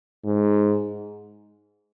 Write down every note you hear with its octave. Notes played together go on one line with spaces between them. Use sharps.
G#2